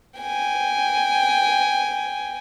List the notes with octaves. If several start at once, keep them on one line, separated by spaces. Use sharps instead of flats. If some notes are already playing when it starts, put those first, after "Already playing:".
G5 G#5